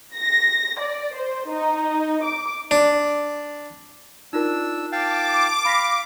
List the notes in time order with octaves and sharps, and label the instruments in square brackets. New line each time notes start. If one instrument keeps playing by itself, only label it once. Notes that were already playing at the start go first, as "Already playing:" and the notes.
[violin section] A#6
D5
C5
D#4
D6
[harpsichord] D4
[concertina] D4 E6 [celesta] D#4 F4 A#4
[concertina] F5 G5 A5 [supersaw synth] D6
[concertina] F5 [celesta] B5 A#6 B6